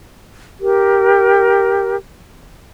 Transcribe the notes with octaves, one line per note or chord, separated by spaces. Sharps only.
G4 A#4